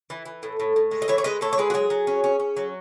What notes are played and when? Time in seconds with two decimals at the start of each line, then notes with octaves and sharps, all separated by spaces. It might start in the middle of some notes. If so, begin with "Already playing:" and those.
0.10 E3
0.26 E3
0.43 A2
0.60 A2
0.76 A2
0.91 G#3
1.02 D#5
1.08 E3 C#5 E5
1.18 C#5
1.24 G#3 B4 D#5
1.41 A2 A4 C#5
1.53 C#5
1.58 G#3 G#4 B4
1.70 F#4
1.74 F#3 G#4
1.90 F#3
2.07 C#4
2.24 C#4
2.40 C#4
2.57 F#3